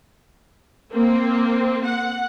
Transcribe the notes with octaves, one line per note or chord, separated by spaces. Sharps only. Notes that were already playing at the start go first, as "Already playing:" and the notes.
A#3 C4
F#5